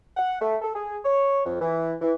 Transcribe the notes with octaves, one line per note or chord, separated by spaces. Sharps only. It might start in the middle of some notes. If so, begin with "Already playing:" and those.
F#5
A3
A4
G#4
C#5
F2
E3
E3